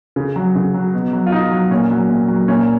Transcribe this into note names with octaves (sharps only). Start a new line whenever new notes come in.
C#3
F#3
C#3
F#3
B2
F#3
F4
B2 D#4
F#3
A#2 C#4
F#3
A#2
F#3
A#2 C#4